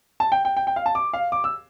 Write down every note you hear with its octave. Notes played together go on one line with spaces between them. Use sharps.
A5
G5
G5
G5
G5
F5
A5
D6
F5
D6
E6